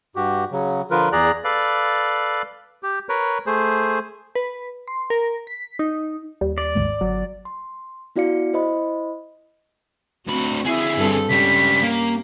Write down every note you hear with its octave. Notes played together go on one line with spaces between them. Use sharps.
G2 F#4 G4
C#3 F#3
D3 F3 F4 A#4 B4
E2 G#4 D5 A#5 F#6
A4 B4 D5 F5
G4
A#4 B4 C#5
A3 G#4 C5
B4
C6
A#4
B6
D#4
D#2 G3
D5
G#1 C#2 G#2
G1 F#3
C6
B3 E4 F#4 D5 F5 C#7
E4 C5 D#5 B5
D2 C4 F#4 B5
D3 C4 E4 G#4
G2 C4 A4
C#2 G3 C#4 G4 B6
A#3